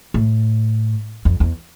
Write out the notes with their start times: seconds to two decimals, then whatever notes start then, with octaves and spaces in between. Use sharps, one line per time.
0.14 A2
1.25 F2
1.40 E2